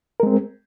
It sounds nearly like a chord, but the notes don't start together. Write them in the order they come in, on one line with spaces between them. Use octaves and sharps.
A#4 G#3 C4